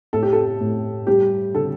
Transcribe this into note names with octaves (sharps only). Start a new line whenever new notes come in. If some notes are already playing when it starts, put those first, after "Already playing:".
A2 A4
G4
A4
A2
G3 G4
D3 A4